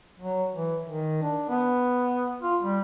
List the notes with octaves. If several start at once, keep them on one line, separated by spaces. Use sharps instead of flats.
F#3
E3
D#3
D4
B3
F4
G3